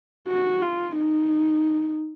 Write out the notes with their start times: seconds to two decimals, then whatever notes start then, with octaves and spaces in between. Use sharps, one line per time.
0.28 F#4
0.62 F4
0.97 D#4